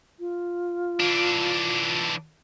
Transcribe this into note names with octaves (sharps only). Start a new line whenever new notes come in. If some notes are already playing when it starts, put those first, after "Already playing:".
F4
E3 D4